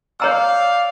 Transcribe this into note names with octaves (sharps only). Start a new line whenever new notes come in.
C#5 D5 F5 A#5 E6